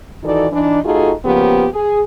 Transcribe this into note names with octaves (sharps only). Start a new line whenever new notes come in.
D#3 E3 D#4 F#4 A4 D5
E3 D4 D#4
A3 D#4 F4 F#4 G#4 A4
C#3 F3 A#3 B3 G4
G#4